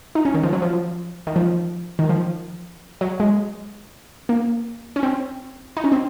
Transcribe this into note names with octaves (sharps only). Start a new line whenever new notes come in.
D#4
C#4
D#3
F3
F#3
F3
D#3
F3
D#3
F3
F#3
G#3
A#3
C#4
C4
D#4
C#4
C4